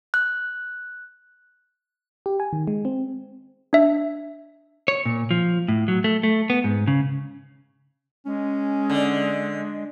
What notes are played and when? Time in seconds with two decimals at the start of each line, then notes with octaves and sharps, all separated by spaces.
0.14 F#6
2.26 G4
2.40 G#5
2.53 D#3
2.67 G#3
2.85 C4
3.73 D4 E5
4.88 C#5
5.06 A#2
5.31 F3
5.68 A2
5.88 F#3
6.04 A3
6.23 A3
6.50 B3
6.64 G#2
6.87 C#3
8.26 G#3 C#4
8.90 D3